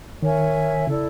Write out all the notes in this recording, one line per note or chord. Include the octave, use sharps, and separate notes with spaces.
D#3 A#4 C#5 E5 G#5
C#3 E4 A4 D5